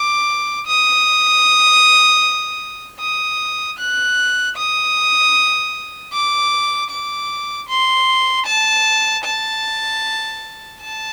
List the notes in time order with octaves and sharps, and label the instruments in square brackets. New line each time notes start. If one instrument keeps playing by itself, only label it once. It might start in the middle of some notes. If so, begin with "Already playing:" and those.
Already playing: [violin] D6
D#6
D#6
F#6
D#6
D6
D6
C6
A5
A5
A5